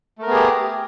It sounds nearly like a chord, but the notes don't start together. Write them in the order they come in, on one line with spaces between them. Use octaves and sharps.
A3 A#4 B3 G#4 G4